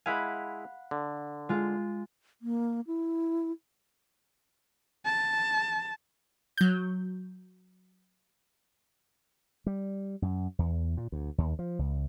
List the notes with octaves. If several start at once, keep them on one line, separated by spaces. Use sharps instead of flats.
G#3 E4 F5 F#5 G#5 B5
D3
G#3 F4
A#3
E4
A5
F#3 G6
G3
F#2
E2
A#2
D2
D#2
F3
C#2